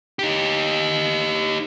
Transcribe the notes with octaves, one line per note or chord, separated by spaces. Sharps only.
D#4 G4